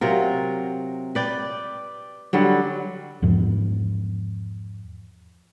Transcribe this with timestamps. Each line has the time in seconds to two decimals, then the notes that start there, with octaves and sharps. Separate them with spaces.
0.01 C3 F#3 F4 A#4
1.15 B4 D5 G5
2.33 D3 F#3 G3
3.22 E2 G#2 F3